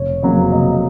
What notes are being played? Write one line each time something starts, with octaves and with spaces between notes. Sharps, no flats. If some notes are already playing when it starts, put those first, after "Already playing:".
Already playing: F1 C#5
F2 C#3 F#3 A#3
F1 D#5